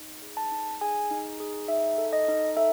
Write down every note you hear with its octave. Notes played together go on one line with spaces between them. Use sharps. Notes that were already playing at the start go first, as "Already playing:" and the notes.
Already playing: D#4
G#4
A5
D#4
G#4 G#5
D#4
G#4
D#4 E5
A4
D#5
D#4
A4 E5